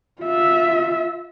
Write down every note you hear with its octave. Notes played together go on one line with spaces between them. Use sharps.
F4 E5